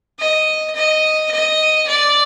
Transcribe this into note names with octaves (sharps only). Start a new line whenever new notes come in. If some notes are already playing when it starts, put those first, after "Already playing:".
D#5
D#5
D#5
D5